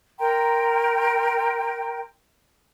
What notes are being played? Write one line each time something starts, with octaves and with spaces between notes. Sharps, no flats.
A#4 G5 A#5 C6